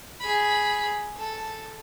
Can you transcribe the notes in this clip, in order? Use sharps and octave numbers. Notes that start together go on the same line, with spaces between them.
G#4 B5
A4